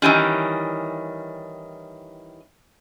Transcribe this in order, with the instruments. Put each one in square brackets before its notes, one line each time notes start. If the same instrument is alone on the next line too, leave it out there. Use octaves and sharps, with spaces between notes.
[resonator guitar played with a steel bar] D#3 E3 G3 C#4